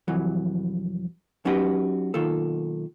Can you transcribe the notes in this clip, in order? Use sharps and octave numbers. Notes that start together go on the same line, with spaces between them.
C2 F2 E3 F#3
F#3 C#4 D#4 F#4 G4 B4
B1 D#3 A#3 F4 A4